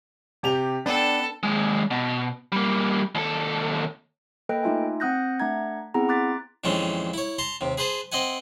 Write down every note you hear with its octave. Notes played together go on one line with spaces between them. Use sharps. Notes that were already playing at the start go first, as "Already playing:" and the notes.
C3 G4 F7
B3 D4 A4 G5
D#2 G#3
B2
G3 A#3
D#2 A4
A#3 A4 B4 D#5 G5 F#6
A3 D#4 F4 E5 G#5
C4 F#5 D#6 F#6 G6 A#6
A3 D4 E5 F#5 A#5 G#6
B3 C4 E4 G#4 F#5 A#5
C6 D6 F#6 A6 B6
F2 A#2 D#3 E3 G#3 C#4
E4 C#5
A5 A#5 C6
D#2 C3
G#4 B4 C5 A5
C4 D#5 E5 F#5 G#5